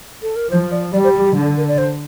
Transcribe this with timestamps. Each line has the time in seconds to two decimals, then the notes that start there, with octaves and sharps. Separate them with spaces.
0.22 A4
0.36 A#4
0.50 F3 C5
0.71 D5
0.93 G3 D5
1.04 C5
1.14 G4
1.25 G4
1.35 D3
1.57 A#4
1.68 D5
1.78 C5